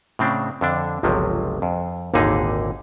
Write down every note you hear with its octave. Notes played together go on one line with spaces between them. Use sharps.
A2 C#3 C4 D4
F2 D3 D4
G1 C#2 C3 F3 F#3
F2
G#1 D#2 A#2 D3 D#4 G#4